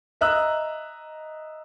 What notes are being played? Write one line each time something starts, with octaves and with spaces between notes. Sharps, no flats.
D#5 E5 A#5 D#6 E6 F#6